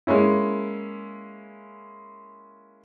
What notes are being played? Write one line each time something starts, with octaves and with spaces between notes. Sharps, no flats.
G#3 A#3 C#4 E4